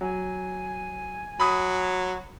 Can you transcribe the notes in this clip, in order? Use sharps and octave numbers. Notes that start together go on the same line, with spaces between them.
F#3 G#5
F#3 B5 D#6